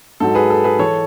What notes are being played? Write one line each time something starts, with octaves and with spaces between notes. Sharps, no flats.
G#2 F#3 A4
G#4 B4
A4
G#4 B4
E3 A4 C#5